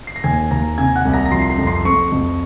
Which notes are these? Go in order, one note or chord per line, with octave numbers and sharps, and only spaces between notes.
C7
A#6
D#2 G#5 G#6
D#2 A#5 A#6
C3 G#5 G#6
F#5 F#6
C2
A#5 A#6
A#6
F3 C6 C7
C7
A#5 A#6
F2
C6 C7
F2 C#6 C#7
F2